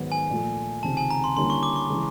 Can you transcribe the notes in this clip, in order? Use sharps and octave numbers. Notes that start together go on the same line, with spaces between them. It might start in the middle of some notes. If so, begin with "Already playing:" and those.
Already playing: G#2 D#3 F#3 B3
G#5
A#2 F3 A3
C#2 C3 D#3 A5
G#5
A#5
C6
D3 G3 A#3 C#4 E4 C6
C#6
D6
C#6
C#3 E3 G#3